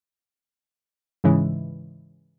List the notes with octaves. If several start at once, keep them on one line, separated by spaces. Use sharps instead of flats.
G#2 C#3 E3 G#3